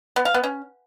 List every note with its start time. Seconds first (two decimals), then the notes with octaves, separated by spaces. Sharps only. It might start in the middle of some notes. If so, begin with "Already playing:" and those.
0.16 B3
0.25 F5
0.34 B3
0.43 C#4